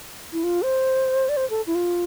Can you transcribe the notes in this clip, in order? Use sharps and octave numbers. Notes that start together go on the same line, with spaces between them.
E4
F4
C5
D5
C5
A4
E4
F4